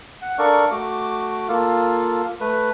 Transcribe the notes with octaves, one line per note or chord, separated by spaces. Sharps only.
F#5
D4 A4 A#4 D5 F5 C#6
A3 F#4 D6
A#3 F4 A4 F5
A3 B4